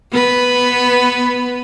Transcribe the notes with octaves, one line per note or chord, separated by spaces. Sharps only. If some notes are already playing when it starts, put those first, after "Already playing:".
B3 B4